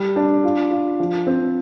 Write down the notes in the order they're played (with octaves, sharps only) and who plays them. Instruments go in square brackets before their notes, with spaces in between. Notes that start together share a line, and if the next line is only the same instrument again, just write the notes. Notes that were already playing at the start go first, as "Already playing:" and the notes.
Already playing: [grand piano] G3
D4
F4
F4
F3
C4